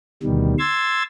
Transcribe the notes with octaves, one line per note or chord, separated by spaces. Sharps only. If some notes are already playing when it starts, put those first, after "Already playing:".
D2 B2 D#3 G3
C6 E6 G#6 A6